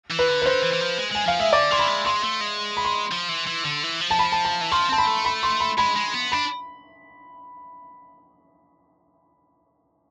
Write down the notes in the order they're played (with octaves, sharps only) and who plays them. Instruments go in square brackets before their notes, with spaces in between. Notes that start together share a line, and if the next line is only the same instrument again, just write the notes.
[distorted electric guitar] E3
[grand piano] B4
[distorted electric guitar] D3
[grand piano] B4
[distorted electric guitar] D3 [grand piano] C5
[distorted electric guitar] E3
E3
F3
G#3
[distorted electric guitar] G#3 [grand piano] G#5
[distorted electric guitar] F3 [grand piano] F5
[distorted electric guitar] G#3 [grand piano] E5
[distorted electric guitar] D3 [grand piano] D5
[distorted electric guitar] E3 [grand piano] C6
[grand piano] B5
[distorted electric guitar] G#3
[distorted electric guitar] G#3 [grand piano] C6
[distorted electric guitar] A3
G#3
[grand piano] B5
C6
[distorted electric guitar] F3
E3
E3
D3
E3
F3
[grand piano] A5
B5
A5
A5
[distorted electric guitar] E3
[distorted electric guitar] F3 [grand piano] C6
[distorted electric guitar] C4 [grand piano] A5
[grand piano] B5
[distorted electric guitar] A3
[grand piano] B5
C6
B5
[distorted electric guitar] G#3 [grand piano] B5
[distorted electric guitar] G#3
B3
[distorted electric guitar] D4 [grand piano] B5